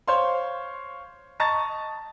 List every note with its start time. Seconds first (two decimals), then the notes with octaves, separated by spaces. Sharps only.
0.08 C5 C#5 F5 C6
1.40 D#5 A5 A#5 C#6 A6